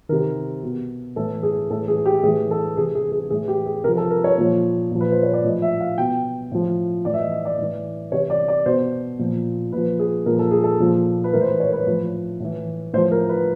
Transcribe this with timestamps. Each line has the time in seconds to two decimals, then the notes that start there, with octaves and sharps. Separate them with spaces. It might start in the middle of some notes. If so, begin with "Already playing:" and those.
0.09 C3 D#3 A#4
0.63 B2
1.16 A2 E3 A4
1.43 G#4
1.70 A2 E3 A4
1.88 G#4
2.06 G4
2.23 A2 G#4
2.27 E3
2.51 A4
2.77 C3 E3 G#4
2.95 G#4
3.12 G#4
3.30 A2 E3 G#4
3.48 G4
3.66 G#4
3.84 C3 F3 A#4
3.97 A4
4.10 A#4
4.24 C#5
4.38 A#2 F3
4.91 A#2 F3
5.01 B4
5.12 C5
5.23 C#5
5.33 D5
5.45 A2 F3 D#5
5.62 E5
5.80 F5
5.98 B2 G5
6.52 A2 F3
7.05 A2 E3 D5
7.14 E5
7.19 D#5
7.32 D#5
7.45 D5
7.58 A2 E3
8.12 C3 E3 C#5
8.30 D5
8.48 D5
8.66 B2 C5
9.19 A#2 F3
9.72 A#2 F3 B4
9.99 G#4
10.26 A#2 F3 A#4
10.39 A4
10.51 G#4
10.64 A4
10.80 A#2 F3
11.24 B4
11.33 A2 E3 A#4
11.41 C5
11.47 B4
11.60 C#5
11.69 A#4
11.73 B4
11.87 A2 F3
12.40 A2 E3
12.94 A2 C5
12.97 F3
13.12 A#4
13.29 B4